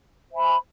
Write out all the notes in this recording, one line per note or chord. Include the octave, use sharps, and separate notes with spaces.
C5 E5 G#5 B5